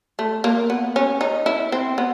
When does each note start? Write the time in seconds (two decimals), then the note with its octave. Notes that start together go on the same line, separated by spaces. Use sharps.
0.19 A3
0.44 A#3
0.70 B3
0.96 C#4
1.21 D#4
1.46 E4
1.72 C4
1.98 B3